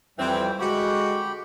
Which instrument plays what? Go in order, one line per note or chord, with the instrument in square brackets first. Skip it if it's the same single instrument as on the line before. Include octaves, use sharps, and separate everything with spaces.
[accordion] F2 G3 G5 [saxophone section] E3 C4
[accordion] D3 [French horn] G#3 [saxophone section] F#4 [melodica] G4 G5 B5